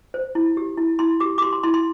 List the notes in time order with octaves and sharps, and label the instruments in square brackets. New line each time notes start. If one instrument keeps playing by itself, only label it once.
[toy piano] C5
E4
G4
E4
E4 C6
G4 D6
D6
G4 C6
C6
E4 C6
C6